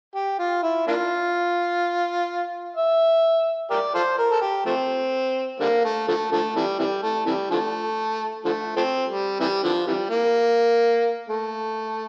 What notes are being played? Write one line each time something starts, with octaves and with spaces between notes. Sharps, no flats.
G4
F4
E4
A#3 D4 F4
E5
G4 A#4 D5
F4 A4 C5
A#4
A4
G4
F3 A3 C4
D3 G3 A#3
A3
D3 F3 A3
D3 F3 A3
C3 E3 G3
C3 E3 G3
A3
C3 E3 G3
D3 F3 A3
D3 F3 A3
F3 A3 C4
G3
C3 E3 G3
D3 F3
C3 E3 G3
A#3
A3